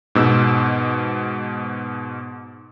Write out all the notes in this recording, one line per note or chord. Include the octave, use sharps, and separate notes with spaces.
G#2 B2 E6